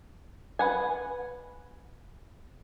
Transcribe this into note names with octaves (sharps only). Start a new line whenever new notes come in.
B4 F#5 G#5